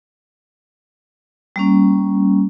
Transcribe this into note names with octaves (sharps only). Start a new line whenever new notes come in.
G3 A#3 C#4